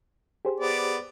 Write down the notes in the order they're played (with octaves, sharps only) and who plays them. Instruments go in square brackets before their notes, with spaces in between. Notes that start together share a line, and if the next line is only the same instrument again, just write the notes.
[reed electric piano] G4 G#4 C5
[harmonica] B3 D5